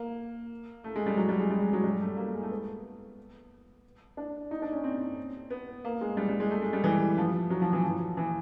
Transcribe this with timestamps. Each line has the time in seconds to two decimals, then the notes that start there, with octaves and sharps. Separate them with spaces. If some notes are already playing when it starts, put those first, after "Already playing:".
Already playing: A#3
0.84 A3
0.96 G#3
1.06 G3
1.17 F#3
1.29 G3
1.39 G#3
1.50 G3
1.62 G#3
1.73 F#3
1.84 G3
2.01 A3
2.17 A#3
2.34 G#3
2.43 A3
2.51 B3
4.17 D4
4.51 D#4
4.62 D4
4.72 C#4
4.84 C4
5.50 B3
5.85 A#3
6.01 G#3
6.17 G3
6.29 G3
6.40 G#3
6.51 A3
6.62 G#3
6.73 G3
6.84 E3
7.18 F3
7.50 F#3
7.62 F3
7.73 E3
7.84 F3
8.17 E3